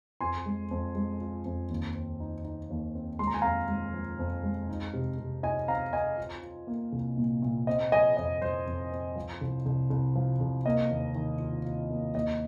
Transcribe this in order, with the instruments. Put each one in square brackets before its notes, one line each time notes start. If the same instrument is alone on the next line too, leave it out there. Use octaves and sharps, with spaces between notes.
[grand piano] F2 G#5 C6
G#3
F2
G#3
F4
F2
D#2
C4
D#4
D#4
D#2
C4
G#3 C6
A#5
G#5
F2 F5 A#5
G#3
F3
F2
G#3
D#4
C3
C3
D#4 D#5 G#5
C4 F5 A#5
C4 D#5 G#5
F4
F4
A#3
C2
A#2
A#2
C4 D#5
F3 D#5 G#5
F2 D#5
F3 C5
F2
C4
F3
C2
C2
C2
F3
C2
A#3 D#5
D#2
D#3
F4
F4
A#3
D#2 D#5